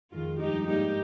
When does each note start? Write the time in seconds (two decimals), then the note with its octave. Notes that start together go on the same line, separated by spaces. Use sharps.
0.12 F2 D#3 G#3 F4
0.40 G2 F3 G#3 D#4 G4
0.68 G#2 G3 A#3 D#4 G4